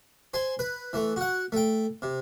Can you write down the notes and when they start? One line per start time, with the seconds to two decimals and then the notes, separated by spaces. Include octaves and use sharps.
0.34 C5 G#5 C6
0.59 B4
0.93 E3 A3
1.16 F#4 F#5
1.52 A3 G5
2.02 C3